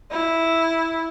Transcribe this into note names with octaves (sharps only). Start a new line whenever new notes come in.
E4